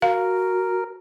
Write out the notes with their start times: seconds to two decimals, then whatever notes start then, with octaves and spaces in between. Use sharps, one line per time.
0.02 F#4 A#4 F5